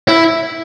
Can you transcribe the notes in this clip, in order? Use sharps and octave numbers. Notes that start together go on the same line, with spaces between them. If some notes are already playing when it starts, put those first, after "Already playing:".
E4